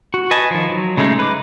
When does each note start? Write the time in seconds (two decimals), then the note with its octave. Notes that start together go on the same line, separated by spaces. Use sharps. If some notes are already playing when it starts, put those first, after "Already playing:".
0.14 F#4
0.31 B4 D#5 G#5 A5
0.51 D#3 F3
0.70 F#3
0.97 C#3 G#3 A3 C#4 D#4
1.19 B4 D6